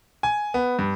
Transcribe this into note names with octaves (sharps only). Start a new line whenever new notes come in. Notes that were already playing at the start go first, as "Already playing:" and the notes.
G#5
B3
G2